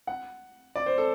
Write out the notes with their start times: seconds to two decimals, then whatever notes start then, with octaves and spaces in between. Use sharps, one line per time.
0.07 F#5
0.75 D5
0.86 C5
0.98 A4